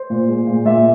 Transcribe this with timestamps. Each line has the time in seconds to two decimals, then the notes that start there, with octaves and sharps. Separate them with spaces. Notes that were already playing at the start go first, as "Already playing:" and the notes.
Already playing: C5
0.10 A#2
0.29 G#3
0.47 A#2
0.65 A#2 E5